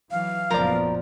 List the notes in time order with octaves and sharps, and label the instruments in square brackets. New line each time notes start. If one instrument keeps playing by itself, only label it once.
[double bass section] E3 F#3 [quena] F5
[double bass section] F#1 A#2 B3 [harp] F3 D5 [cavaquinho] A#4